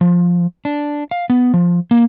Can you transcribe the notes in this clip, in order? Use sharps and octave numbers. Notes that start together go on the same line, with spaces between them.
F3
D4
F5
B3
F3
A#3